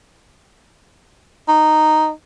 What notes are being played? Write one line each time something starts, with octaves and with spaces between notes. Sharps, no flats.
D#4